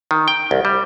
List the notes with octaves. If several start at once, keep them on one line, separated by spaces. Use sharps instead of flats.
D#3
G5
C2
G3